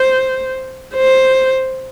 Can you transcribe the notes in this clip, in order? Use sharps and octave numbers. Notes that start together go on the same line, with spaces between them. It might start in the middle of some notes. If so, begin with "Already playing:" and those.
Already playing: C5
C5